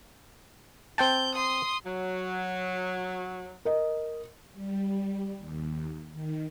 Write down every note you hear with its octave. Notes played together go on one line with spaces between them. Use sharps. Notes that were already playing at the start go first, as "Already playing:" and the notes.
C4 G5 A5 G6
C6 D#6
F#3
A#4 D#5
G3
D#2
D#3